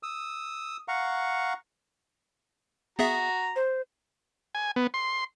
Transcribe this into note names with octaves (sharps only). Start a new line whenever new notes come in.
D#6 E6
F5 F#5 A#5 C#6
B3 F#4 G#4 E5 A#5
C5
G#5
B3
C6